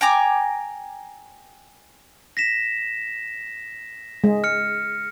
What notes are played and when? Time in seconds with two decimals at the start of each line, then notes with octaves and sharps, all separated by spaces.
0.01 G5 G#5 A#5 D6
2.37 A#6 B6 E7
4.24 G#3
4.44 F6 C#7